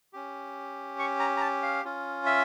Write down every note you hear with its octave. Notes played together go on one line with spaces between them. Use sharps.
C#4 G4
C#6
A#5
A#5
A5
F5
C#4 F4
E5